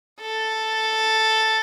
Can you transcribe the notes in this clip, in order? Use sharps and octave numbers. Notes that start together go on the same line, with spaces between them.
A4